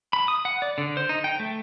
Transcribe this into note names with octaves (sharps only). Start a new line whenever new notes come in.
B5
D#6
F#5
D5
D3
C5
D#4
G5
A3